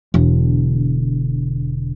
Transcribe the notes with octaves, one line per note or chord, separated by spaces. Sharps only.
E1 D3